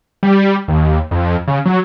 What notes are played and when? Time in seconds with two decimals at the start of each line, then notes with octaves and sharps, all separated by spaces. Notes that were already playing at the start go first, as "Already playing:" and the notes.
0.23 G3
0.68 D#2
1.11 F2
1.48 C#3
1.66 F#3